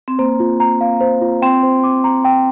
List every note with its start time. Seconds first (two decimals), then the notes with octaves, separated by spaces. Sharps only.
0.08 C4
0.19 A#3 C5
0.40 F4
0.60 A#5
0.81 F5
1.01 C5
1.21 F4
1.42 C4 G5
1.63 C5
1.84 D6
2.04 A#5
2.25 G5